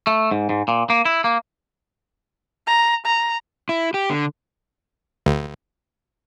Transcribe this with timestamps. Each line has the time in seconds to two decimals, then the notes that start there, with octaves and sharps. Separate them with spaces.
0.07 A3
0.31 G#2
0.49 G#2
0.68 A#2
0.90 A#3
1.05 E4
1.24 A#3
2.67 A#5
3.06 A#5
3.69 E4
3.94 G4
4.10 D3
5.26 D2